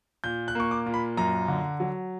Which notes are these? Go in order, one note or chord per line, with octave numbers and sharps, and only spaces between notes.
A#2 G6
F#6
A#3 C#6
D6
A#2
B5
F#2 A#5
D3
F#3